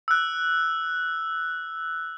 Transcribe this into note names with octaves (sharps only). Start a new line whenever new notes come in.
E6 F#6